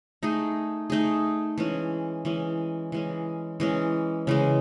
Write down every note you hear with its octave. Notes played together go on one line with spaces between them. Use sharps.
A3 D#4 G#4
A3 D#4 G#4
E3 G#3 C#4
E3 G#3 C#4
E3 G#3 C#4
E3 G#3 C#4
C#3 E3 G#3